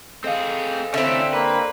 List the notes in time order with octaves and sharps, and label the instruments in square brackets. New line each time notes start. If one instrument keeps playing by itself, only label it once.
[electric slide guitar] C4 G#4 [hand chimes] A4 D#5 F5
[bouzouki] D3 C4 [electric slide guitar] C#4 E4 [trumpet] E5
[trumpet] A#3 [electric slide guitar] B4